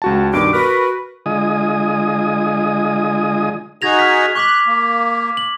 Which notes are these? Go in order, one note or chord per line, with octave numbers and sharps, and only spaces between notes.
C#2 F#4 A5
G2 B2 D#3 D6
F#4 A#4 B4 F6
D3 G#3 F4 D#5 G#5 D#6
D#4 F#4 G#4 G#6 A#6 F7
F6 G#6 B6
C#6 D6 F#6 B6
A#3
F#7